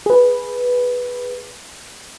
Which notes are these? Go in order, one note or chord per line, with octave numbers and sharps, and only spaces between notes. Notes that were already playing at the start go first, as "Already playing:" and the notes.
G#4 B4